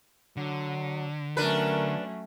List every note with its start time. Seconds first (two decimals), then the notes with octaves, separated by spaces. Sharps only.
0.37 D3 F#3
1.37 F#3 A3 C#4 D4 A#4 B4